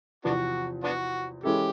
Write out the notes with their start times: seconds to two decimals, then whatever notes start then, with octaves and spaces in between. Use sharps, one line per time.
0.25 E2 C3 F3 B3 D4 F#4
0.84 B3 D4 F#4
1.43 E3 G#3 C#4 E4 G4 A4